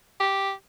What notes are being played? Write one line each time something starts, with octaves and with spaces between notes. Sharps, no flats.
G4